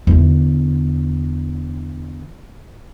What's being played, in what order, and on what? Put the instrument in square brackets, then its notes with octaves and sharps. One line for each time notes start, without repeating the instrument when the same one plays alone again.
[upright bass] E2 D3